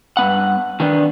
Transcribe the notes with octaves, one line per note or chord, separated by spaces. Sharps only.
G2 B3 F#5
D#3 B3 D4